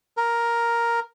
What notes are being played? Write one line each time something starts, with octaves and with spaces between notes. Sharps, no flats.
A#4